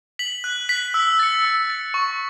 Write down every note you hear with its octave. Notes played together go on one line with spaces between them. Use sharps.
B6 F#7
F#6
B6 F#7
E6
A6 C#7
E6
A6 C#7
C#6